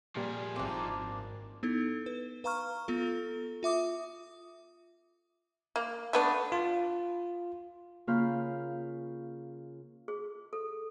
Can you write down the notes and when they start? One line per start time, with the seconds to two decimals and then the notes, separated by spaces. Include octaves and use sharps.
0.16 A#2 F3 G3 G#4
0.56 G#1 A#3 C4 D4
1.63 B3 D#4 E4 A4
2.06 B4
2.44 B4 F5 A#5 C#6 F6
2.88 B3 F4 A4
3.63 F4 E5 D6 D#6
5.76 A#3
6.13 A3 B3 D4
6.52 F4
8.07 C#3 A#3 F4 F5 B5 G6
10.08 G#4
10.53 A4